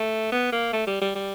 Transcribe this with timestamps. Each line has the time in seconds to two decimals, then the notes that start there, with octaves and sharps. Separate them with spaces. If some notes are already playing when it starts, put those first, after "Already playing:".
Already playing: A3
0.32 B3
0.52 A#3
0.73 A3
0.87 G3
1.01 G3
1.15 G3